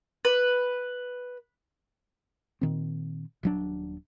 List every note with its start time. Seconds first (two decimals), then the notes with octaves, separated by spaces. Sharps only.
0.25 B4
2.61 A#2 D#3 C4
3.43 D#1 F#3 D4